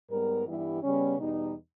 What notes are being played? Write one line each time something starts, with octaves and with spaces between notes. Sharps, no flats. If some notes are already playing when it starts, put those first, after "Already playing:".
G#2 G3 B3 A#4
G2 E3 G3 B3 E4
C#3 G3 B3 C#4
E2 B2 G3 D#4